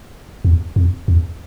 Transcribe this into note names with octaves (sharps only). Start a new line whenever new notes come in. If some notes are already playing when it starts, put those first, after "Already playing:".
E2
F2
E2